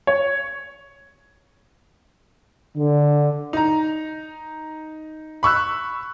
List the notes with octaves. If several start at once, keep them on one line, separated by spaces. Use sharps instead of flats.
C#5
D3
D#4 A#5
B5 C#6 E6 F#6